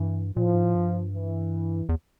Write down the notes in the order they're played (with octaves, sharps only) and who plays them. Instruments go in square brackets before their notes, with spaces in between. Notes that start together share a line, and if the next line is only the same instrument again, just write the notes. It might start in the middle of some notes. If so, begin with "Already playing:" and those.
Already playing: [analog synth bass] G2 [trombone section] E3
[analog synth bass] A#2 [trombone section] F3
[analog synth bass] A2
G#2
A2
G2
[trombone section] E3
[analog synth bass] E2